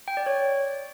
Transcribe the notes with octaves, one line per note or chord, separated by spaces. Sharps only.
G5
D5
C#5